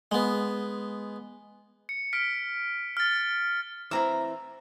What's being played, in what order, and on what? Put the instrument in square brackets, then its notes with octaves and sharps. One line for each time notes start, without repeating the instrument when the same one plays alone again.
[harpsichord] G#3 B3
[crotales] C#7
F6 B6 D7
F6 A6
[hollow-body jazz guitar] E3 C4 E4 [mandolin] A#5 E6